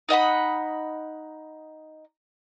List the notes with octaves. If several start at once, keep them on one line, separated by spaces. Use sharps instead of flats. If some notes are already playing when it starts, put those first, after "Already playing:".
D#4 D#5 F#5 B5